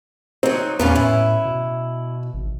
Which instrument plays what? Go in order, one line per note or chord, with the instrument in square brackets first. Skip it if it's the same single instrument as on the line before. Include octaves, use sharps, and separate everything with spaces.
[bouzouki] F#3 D#4 [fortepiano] C4
[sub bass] E2 [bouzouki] A#2 F4 F5 [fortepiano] B3 C#4
[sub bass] A2 [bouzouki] E4
[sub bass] B2
G#1